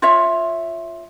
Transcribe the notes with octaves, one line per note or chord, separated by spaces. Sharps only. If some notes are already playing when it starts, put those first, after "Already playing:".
F4 C#5 E5